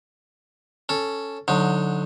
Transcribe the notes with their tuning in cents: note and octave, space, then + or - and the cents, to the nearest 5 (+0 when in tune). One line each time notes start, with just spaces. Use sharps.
C#4 +0 A4 +0
D3 +0 F#3 -25 D#4 +0